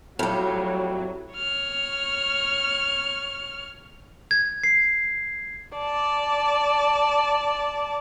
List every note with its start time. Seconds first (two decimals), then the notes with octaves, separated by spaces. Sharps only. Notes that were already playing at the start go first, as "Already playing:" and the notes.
0.19 F2 A2 F#3 G3
1.35 C#5 F6
4.31 G#6
4.64 C7
5.78 D5 A5